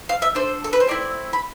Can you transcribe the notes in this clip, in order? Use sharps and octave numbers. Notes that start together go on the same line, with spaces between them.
F5
E5
D4 A4 C5
A4
B4
C5
A3 C4 E4 D5
B5